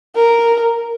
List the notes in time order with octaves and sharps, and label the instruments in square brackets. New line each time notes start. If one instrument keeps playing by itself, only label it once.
[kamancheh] A#4